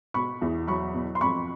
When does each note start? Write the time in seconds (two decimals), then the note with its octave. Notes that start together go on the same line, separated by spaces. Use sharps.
0.14 B2 B5 C#6
0.42 E2
0.67 F#3 B5 C#6
0.94 B2
1.15 C6
1.21 F2 B5 C#6